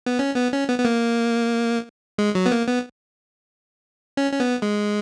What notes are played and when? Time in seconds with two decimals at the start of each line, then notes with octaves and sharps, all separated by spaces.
0.06 B3
0.19 C#4
0.36 B3
0.52 C#4
0.68 B3
0.78 B3
0.85 A#3
2.18 G#3
2.35 F#3
2.46 B3
2.51 A#3
2.67 B3
4.17 C#4
4.32 C#4
4.40 B3
4.62 G#3